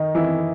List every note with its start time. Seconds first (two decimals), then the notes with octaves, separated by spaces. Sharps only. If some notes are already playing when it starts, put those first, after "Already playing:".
Already playing: D#3 D#4
0.15 E3 E4